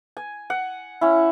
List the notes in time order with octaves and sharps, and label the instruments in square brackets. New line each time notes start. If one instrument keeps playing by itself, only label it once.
[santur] G#5
F#5
C#4 E4